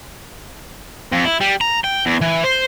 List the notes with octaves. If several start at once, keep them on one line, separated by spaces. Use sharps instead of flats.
F2
E4
G3
A#5
G5
E2
E3
C5